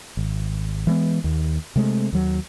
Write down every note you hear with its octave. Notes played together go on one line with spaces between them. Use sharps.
G#1
E3 G#3 B3
D#2
C3 G#3 A3
D#2 F#3